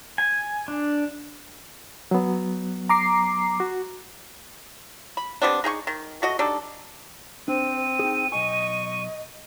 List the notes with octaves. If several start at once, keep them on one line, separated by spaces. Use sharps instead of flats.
G#5
D4
F#3 B3
A#5 D6 C7
F#4
B5
G3 B3 C4 D4
D#4 G#4 G5 C#6
D#3
A3 F#4 D#5
G3 D4 D#4 A4
C4 D4 C5 D#7
D#4 G#4 G5
B1 D#5 G#5 C#6